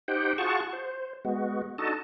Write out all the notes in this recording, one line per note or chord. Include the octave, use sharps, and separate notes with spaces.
D#4 G4 C5 F#5 G5
F4 F#4 G#4 F#5 A5 C#6
C5
G#3 B3 F#4
D4 D#4 F#4 A4 D#5 A5